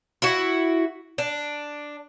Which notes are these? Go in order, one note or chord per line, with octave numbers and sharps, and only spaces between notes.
E4 F#4
D4